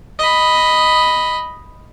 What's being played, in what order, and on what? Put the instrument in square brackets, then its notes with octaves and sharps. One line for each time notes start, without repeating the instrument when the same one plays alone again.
[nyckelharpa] D#5 B5